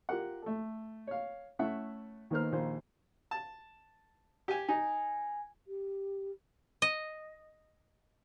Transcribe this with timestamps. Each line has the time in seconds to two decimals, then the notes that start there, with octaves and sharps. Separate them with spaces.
0.09 F4 G4 A#4 F#5
0.42 A3 A4
1.07 C#5 F5
1.59 A3 C#4 E4 E5 F#5
2.30 D#2 D#3 B3 A#4 C5 F6
2.52 A#1 D#2 F3 C5
3.31 A5
4.48 G4 G#5
4.69 D#4 G#5
5.67 G4
6.82 D#5